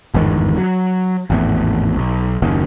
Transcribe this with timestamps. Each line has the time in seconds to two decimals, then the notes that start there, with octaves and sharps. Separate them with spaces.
0.14 G1 E2 G#2 D#3
0.58 F#3
1.30 G#1 E2 A2
1.97 B1
2.42 F#1 D#2